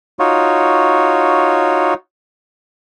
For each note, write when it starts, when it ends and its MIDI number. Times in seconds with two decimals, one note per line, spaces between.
0.19 1.94 63
0.19 1.94 65
0.19 1.94 66
0.19 1.94 73